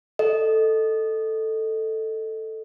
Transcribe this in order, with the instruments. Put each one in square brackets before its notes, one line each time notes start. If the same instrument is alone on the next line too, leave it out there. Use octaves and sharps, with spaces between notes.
[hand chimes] A4 D#5